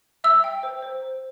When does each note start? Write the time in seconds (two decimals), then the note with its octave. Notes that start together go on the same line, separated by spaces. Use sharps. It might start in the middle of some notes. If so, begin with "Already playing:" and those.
0.24 E5 E6
0.44 G5
0.63 C5
0.82 C5
1.02 C5